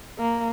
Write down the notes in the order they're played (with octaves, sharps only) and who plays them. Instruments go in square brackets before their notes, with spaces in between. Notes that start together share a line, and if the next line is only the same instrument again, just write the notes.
[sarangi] A#3